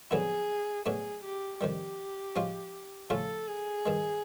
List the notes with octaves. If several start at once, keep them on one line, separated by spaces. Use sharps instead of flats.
F2 D3 F#3 B3 E4 G#4
B2 F#3 A3 D4 G#4
G4
F2 C3 D#3 G3 G4
F3 G#3 C#4 F4
C#3 F3 A3 C#4 F4 A4
G#4
G2 D#3 G#3